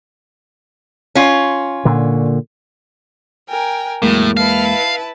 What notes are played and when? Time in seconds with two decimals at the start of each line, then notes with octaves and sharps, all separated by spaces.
1.15 C#4 F4
1.85 A#2 D3
3.49 A#4 G5 G#5
4.02 E2 A2 F#3 G#3 A#3
4.37 E4 B4 F5 A5